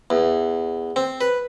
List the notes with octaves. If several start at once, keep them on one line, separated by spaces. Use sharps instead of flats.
E2
C4
B4